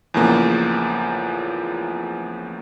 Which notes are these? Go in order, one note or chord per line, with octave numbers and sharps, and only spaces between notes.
E2 A2 C#3 F3 A#3